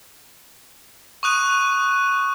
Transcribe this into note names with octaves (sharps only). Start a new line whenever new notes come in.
C#6 D#6 F#6 D#7